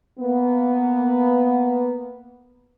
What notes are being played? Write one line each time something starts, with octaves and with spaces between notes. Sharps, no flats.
A#3 B3